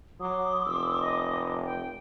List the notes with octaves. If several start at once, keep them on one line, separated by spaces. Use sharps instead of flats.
F#3 C6 D6 D#6
F1 E6
D#5
G5